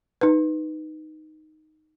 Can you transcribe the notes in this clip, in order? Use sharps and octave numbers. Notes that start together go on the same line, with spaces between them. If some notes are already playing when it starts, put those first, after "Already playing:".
D#4 B4